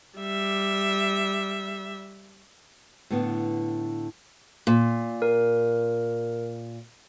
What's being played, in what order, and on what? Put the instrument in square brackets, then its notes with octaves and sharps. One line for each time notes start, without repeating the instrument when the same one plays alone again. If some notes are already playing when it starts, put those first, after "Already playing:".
[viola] G3 E5
[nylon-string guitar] A2 D3 B3
[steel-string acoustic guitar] A#2
[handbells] A#4